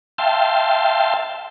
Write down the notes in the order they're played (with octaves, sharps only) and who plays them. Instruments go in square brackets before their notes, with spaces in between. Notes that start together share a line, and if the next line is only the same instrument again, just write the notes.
[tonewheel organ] E5 F5 G5 A5 C6